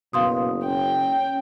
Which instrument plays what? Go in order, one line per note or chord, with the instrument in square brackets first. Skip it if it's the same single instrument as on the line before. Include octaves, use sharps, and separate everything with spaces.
[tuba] F#1 [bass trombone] B2 [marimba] F5 C6 D#6
[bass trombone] C#4 [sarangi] G5